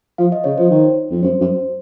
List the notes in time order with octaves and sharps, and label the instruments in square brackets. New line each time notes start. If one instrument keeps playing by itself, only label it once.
[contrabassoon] F3 [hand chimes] F5
[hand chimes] D#5
[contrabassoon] C#3 [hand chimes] C#5
[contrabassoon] F3 [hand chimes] C5
[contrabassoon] D#3
F2
[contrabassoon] F#2 [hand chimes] C5
[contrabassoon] F#2